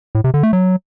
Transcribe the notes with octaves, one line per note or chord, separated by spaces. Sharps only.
A2
C3
D3
A3
F#3